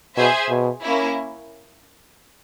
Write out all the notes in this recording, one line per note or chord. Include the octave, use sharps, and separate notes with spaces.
B2 G#4 C5 E5 G#5
B2
A#3 C#4 E4